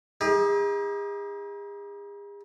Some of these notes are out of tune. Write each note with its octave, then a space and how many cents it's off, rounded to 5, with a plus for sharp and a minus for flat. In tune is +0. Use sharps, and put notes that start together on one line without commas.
D#4 +40 G#4 -40